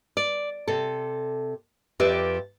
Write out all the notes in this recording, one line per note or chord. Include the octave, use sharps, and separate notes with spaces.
D5
C3 A4
F2 G4 B4 D5 E5